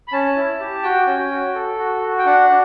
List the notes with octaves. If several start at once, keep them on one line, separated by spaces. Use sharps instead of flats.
B5
C#4 A5
E4
G4
F#4 G5
C#4
F#4
A4
F#4
F#4
G5
D4 F#5
D4